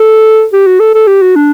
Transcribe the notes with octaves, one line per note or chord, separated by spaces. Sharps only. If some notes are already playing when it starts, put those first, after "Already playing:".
Already playing: A4
G4
F#4
A4
A4
G4
F#4
D4